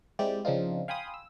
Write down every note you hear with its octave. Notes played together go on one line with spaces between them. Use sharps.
G#3 C4 E4 G4 D5
C#3 F3 C4 D4 D#4 F4
F5 G5 G#5 B5 C6 D#6
E6